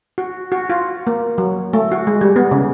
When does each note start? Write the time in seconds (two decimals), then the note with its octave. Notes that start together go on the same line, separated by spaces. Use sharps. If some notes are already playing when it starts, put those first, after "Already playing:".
0.18 F#4
0.52 F#4
0.70 F4
1.07 A#3
1.38 F#3
1.73 A3
1.92 F#4
2.07 G#3
2.21 G3
2.36 B3
2.51 C#3